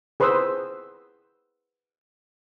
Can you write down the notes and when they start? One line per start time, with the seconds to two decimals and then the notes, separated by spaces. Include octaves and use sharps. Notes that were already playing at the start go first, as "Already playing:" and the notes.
0.20 G#4 B4 C5 C6 D#6 E6